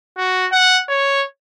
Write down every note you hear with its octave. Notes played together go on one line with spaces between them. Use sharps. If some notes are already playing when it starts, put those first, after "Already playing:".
F#4
F#5
C#5